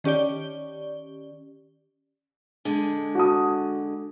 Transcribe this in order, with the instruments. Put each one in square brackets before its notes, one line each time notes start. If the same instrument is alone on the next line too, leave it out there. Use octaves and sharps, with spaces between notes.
[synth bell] D#3 C#4 G4 D5 G7
[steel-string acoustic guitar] D3 G#3
[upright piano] F#4 A5 D#6